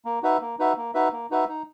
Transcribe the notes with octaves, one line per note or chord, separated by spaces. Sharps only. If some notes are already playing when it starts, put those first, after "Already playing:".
A#3
D#4 F#4 B4 E5
A#3
D#4 F#4 B4 E5
A#3
D#4 F#4 B4 E5
A#3
D#4 F#4 B4 E5
D#4